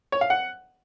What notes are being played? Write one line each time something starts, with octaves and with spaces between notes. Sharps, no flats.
C#5
F5
F#5